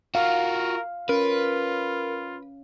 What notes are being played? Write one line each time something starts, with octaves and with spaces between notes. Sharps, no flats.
F4 F#4 A#4 F5
C#4 F4 A#4 B4